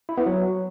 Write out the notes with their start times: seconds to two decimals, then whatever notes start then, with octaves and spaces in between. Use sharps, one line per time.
0.09 E4
0.18 B3
0.26 F#3